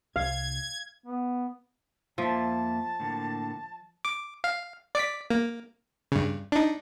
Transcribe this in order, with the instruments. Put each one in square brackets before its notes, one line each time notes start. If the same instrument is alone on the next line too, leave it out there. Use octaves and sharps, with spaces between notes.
[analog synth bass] C2 [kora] F5 [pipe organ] G#6
[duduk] B3
[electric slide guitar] F2 A#3 E5 [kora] F3 [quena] A5
[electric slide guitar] A2 D3 A#3
[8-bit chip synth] D6
F5
D5 D6 B6
A#3
G2 C#3
D4 D#4